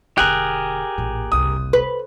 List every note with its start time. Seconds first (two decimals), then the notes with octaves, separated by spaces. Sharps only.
0.18 E1 D3 G4 G#4 A#4 F#6
0.98 A1 A#2
1.32 F#1 C2 D#6
1.73 B4